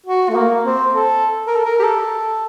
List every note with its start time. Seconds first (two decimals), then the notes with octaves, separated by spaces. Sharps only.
0.06 F#4
0.29 A3
0.35 A#3
0.65 C4
0.95 A4
1.47 A#4
1.56 A4
1.65 A#4
1.79 G4
1.83 A4